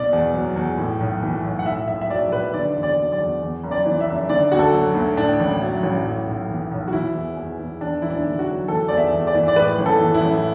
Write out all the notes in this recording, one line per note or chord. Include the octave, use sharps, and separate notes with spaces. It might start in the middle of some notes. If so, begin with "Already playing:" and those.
Already playing: B1 B2 D5
E2
F#3
E2
A2
B1
E3
B1
F#5
A2 E5
B1 E5
E5
F#3 D5
B1 B4
D3 D5
E2
D5
F#3
D5
E2
E2
F#1
D5
E3
E5
F#1
D3 D5
D2 F#4
A4
F#3
D2
A2 D4
A1
F#3
A1
A2
B1
E3
B1
F#4
E3 E4
E2
E2
E3
E2 D4
E1 E4
D4
D3
F#4
F#3
E3 A4
E2 D5
E5
E2
D5
E3
D5
A2 B4
A1
A4
E3
E4
A1